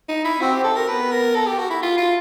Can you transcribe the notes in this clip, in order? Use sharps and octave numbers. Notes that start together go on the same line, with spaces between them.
D#4
E4
C4 F#4
G4
A4
A#4
B3 B4
A#4
A4
G4
F#4
E4
F4
F4